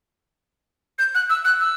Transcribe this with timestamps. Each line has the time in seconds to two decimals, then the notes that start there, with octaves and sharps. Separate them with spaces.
0.99 G6
1.15 F#6
1.30 E6
1.45 F#6
1.61 E6